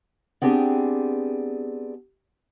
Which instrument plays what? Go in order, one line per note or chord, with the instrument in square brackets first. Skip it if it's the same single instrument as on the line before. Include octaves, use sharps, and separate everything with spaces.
[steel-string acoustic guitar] B3 C4 D4 G4 G#4